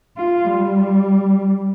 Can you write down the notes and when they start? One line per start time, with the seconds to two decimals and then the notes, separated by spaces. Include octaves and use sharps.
0.17 F4
0.45 G3